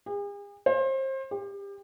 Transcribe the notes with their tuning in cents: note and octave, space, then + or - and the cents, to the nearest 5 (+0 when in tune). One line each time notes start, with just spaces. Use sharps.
G#4 -45
C5 +30
G4 +30